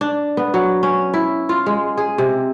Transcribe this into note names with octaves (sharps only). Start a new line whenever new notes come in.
D4
B3
F#3
C#4
E4
F4
G#3
G#4
C3